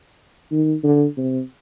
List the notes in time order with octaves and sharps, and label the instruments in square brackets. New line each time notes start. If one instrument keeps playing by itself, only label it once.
[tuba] D#3
D3
C3